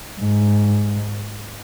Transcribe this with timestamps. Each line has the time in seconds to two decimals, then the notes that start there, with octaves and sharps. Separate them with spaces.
0.20 G#2